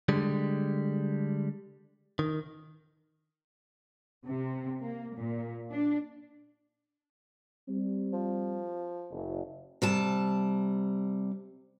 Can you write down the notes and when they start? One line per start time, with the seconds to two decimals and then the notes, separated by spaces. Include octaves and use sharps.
0.09 D3 G3 G#3
2.19 D#3
4.26 C3
4.81 A#3
5.16 A#2
5.71 D4
7.68 G3 C4
8.13 F3
9.10 F#1
9.82 C3 G3 A5